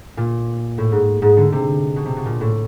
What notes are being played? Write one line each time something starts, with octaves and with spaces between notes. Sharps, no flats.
A#2
A2
G#2
G#2
D3
C3
B2
C3
B2
A#2
A2